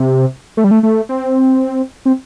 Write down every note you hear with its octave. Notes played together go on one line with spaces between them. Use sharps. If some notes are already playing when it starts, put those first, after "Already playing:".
Already playing: C3
A3
G3
A3
A3
C4
C4